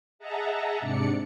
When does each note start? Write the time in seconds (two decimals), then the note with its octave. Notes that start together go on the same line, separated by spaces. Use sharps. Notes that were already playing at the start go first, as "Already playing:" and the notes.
0.19 G#4 D#5 E5 F#5 A5 A#5
0.80 G#2 C3 D4 D5 C#7